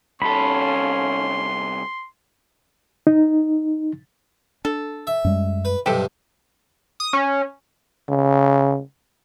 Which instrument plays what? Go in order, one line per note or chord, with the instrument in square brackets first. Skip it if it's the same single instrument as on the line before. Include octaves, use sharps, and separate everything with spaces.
[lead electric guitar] C2 A4 [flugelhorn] C#4 [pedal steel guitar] B5 [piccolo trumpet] C6
[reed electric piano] D#4
[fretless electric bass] D4 [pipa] A4
[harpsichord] E5
[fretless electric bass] F#2 G3 G#3
[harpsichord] B4
[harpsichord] B1 G2 C3 [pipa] G4 A4
[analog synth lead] D#6
C#4
[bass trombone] C#3